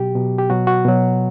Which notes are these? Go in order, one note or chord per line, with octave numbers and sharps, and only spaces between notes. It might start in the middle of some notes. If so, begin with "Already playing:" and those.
Already playing: B2 F#3 G4
B2 F#3
G4
B2 F#3 F#4
F#4
B2 F#3